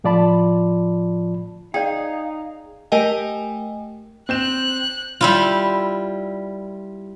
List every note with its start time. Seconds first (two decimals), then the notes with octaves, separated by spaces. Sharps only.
0.04 A2 F3 F4 D5 A5 B5
1.74 D#4 G#4 D5 F5 G5
2.92 A3 G4 A#4 D#5 G5 G#5
4.29 C4 F#6 G6 E7
5.21 G3 E4 F4